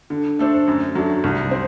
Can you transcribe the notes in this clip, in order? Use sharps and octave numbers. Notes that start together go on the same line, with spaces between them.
D3
A3 D4 A4 C5
F#2
F#3 A3 D4
C2
C4